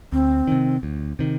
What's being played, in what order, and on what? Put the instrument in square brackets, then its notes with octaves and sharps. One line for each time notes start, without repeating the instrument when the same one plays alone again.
[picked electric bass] D2 [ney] C4
[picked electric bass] C3 D#3
D2
C3 D#3